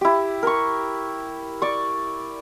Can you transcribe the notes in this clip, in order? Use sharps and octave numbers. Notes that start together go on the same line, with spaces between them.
E4 G4
A#4 C#6
D5 C#6